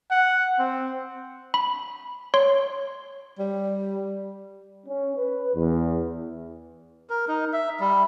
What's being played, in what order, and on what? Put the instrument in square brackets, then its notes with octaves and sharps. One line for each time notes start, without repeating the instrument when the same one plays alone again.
[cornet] F#5
C4
[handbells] B5
C#5 C6
[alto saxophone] G3
[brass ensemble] C#4
B4
E2
[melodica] A#4
D#4
E5
G3